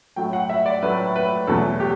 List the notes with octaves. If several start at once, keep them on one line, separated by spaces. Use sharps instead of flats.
A2 F#3 A3 G5
F#5
E5
D5
A2 F#3 A3 B4
B4
E2 B2 F#3 A3 A4
G4